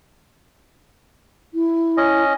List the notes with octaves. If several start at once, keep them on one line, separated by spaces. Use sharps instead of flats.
E4
C#4 D#5